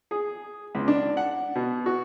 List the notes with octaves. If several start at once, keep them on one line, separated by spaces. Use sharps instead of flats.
G#4
C#2
D4
F#5
B2
F#4